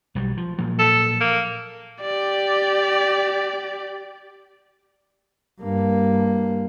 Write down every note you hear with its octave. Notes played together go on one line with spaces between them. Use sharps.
B1 F#3 G3
F3
A#2 F3 F#3
A4
A#3
G4 D5
G2 A#3